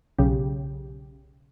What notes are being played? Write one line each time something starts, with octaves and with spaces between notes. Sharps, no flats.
B1 C#3 G4